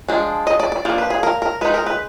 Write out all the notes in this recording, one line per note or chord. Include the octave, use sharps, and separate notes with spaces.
F3 G#3 D4
D#5
D5
D5
F3 A#3 D4 D5
B4
G#4
A#4
A#4
G#3 D#4 B4
A#4
B4